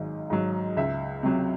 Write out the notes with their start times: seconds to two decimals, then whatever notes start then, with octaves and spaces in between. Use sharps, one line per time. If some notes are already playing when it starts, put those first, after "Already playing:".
Already playing: G#1 G#2 F#3
0.30 G#2 F#3
0.77 C#2 E5
1.23 C3 F#3